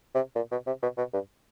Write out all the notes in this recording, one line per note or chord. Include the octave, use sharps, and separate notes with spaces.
C3
A#2
B2
C3
B2
B2
G2